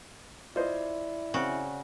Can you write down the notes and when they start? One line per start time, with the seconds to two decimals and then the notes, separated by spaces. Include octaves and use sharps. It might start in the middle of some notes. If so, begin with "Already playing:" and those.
0.56 E4 F4 C5 D5 D#5
1.34 C#3 C4 F#4